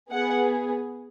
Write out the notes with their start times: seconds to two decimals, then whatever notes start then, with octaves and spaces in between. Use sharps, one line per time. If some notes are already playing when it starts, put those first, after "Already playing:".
0.12 B3 G#4 F#5